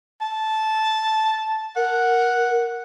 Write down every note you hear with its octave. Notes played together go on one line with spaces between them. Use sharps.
A5
A#4 F#5